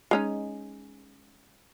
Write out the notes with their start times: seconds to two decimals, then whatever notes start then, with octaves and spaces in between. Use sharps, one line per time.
0.11 G#3 C#4 D#4